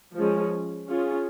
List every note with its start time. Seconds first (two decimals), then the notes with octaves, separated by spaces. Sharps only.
0.15 F3 G#3 C#4
0.87 C#4 F4 G#4